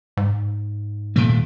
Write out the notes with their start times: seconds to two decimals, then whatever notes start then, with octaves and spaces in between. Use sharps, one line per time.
0.17 G#2
1.16 D#1 A#2 A3